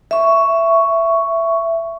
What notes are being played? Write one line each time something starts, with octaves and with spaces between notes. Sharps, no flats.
E5 C#6